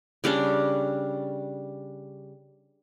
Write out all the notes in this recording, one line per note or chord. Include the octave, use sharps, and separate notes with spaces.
C#3 G3 C#4 D4